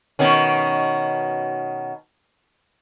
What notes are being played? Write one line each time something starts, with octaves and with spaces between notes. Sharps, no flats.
B2 D#3 C#4